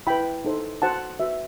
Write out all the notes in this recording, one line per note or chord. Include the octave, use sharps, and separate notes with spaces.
E4 B4 G5 B5
D#4 A4 C5
F#4 C5 F#5 A5
F#4 B4 E5